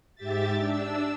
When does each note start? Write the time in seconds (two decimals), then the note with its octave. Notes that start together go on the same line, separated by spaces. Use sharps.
0.15 G#2 G4 E5 A6
0.56 D4 E6